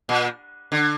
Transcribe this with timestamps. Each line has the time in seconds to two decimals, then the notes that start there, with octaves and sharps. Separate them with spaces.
0.09 A#2
0.72 D3